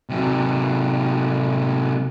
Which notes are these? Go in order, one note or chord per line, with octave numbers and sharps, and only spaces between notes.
C3 F#3